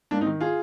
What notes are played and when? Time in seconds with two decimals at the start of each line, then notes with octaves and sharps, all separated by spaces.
0.11 G#2 A#3 D4
0.21 C4 D#4
0.26 D#3
0.40 F4 G#4